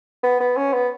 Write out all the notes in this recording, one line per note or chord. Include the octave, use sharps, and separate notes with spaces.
B3
B3
C#4
B3